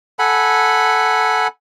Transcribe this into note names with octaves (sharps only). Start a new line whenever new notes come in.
A4 F#5 G#5 B5